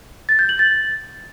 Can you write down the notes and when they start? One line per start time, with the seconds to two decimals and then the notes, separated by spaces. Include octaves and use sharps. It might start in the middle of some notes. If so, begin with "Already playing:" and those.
0.29 A6
0.39 G6
0.49 F#7
0.59 A6